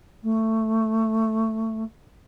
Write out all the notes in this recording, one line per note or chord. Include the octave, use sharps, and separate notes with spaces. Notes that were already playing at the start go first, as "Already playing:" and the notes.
A3